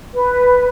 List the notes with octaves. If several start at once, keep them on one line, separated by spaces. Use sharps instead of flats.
B4